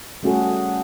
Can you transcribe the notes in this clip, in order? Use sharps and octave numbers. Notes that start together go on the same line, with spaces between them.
G3 A3 C#4 F#4 G#4 A4